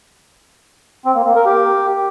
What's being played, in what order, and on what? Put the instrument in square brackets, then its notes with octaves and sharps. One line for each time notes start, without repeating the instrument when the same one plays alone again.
[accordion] C4
A#3
A#3
A#4
G4